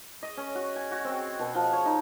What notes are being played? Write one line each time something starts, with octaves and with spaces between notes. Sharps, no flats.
D#5
C#4
F#4
G#5
F#4
C4
B2
F3
C#5
D#4